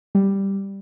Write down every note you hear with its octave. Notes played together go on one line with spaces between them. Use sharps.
G3